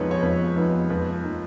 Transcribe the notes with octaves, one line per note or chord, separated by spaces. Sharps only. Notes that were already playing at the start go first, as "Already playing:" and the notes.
Already playing: F2 F3 G#3 B3 D#4 B4 C#5
C#5
F2 B4
F3 G#3 B3 D#4
F2 B4
F3 A#3 D#4